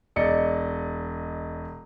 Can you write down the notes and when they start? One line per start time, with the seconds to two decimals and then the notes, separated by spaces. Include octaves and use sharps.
0.16 E1 D5 D#5 C#7